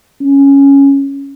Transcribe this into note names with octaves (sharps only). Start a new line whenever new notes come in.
C#4